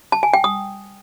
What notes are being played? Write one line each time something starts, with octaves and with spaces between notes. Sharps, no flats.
A5
G#5
G5
D#6